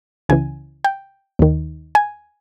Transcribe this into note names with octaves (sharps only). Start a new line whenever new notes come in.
C#2 C#3 E3 G#5
G5
D#2 D#3
G#5